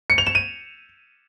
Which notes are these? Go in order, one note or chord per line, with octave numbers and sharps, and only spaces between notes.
C#7
F7
E7
D#7